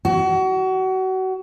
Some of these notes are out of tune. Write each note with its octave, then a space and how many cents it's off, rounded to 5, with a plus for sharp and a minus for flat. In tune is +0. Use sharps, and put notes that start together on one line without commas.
F#4 +30